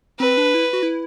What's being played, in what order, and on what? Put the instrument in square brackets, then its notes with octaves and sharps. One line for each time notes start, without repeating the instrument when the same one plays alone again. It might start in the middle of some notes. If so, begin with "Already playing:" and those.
[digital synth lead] C4 [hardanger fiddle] B4
[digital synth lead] D4
E4
F#4
E4